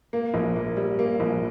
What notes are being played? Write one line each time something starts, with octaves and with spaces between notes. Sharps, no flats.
A#3
A#1
A#3
G3
A#3
A#1